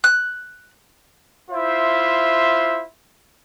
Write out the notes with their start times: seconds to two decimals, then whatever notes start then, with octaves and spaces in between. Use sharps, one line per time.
0.04 F#6
1.51 E4 F4 C5 E5